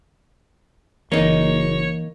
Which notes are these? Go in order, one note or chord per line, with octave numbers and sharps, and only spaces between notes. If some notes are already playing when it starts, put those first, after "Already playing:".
F#1 E3 A#3 D#4 C#5